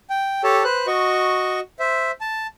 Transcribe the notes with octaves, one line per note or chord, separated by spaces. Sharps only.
G5
G4 A4 C#5 A5
B4 C5 F#6
F#4 D#5 C#6
C5 E5
A5